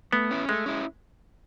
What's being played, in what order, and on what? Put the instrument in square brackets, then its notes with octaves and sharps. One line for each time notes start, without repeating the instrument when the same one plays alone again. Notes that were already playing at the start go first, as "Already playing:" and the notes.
[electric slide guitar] A3 [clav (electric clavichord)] B3
[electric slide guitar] C#4 E4
[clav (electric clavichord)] G#3 [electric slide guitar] A3
[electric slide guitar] C#4 E4